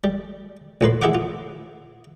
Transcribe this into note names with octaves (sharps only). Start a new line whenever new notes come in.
G3
A#1 A2 B4 C6
E4 G4 G#4 E5 F#5 D6
F4